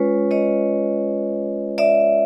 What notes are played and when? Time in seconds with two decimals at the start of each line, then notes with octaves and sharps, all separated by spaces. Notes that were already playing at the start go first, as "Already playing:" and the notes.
Already playing: G#3 C#4 F4 B4 C#5
0.31 C#5 D#5
1.78 D5 E5